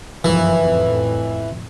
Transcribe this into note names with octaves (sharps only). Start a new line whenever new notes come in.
G1 F#2 E3 F3
F2 A2